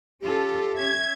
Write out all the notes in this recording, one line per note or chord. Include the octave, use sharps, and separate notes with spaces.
C#4 F4 G4 A4
C#4 E5 G#6